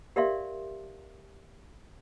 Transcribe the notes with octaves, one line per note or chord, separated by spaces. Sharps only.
G4 A#4 D5 E5 F5 C6